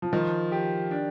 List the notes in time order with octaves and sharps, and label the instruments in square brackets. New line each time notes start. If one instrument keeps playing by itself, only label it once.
[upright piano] F3
[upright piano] D#3 [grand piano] F3
[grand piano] G4
D4